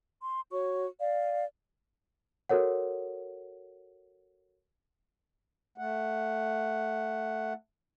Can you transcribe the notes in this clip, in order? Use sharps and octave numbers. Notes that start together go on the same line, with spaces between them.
C6
F#4 C#5 C#6
D5 F5
F#4 A4 A#4 C#5 F#5
A3 F#5